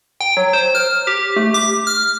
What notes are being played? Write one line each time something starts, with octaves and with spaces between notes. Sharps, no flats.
G5
F#3
C5
F6
G4
A3
D6
F6